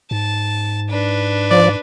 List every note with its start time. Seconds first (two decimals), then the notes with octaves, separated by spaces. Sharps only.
0.11 G#2 A5
0.89 D4 B4
1.51 F3 D5